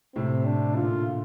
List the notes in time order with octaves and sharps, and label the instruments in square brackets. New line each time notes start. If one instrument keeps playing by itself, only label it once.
[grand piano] A2 C3 [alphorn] C4
[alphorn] D4
[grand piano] A#2 D3 [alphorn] F4